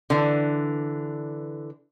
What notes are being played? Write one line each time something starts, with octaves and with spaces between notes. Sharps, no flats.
D3 E3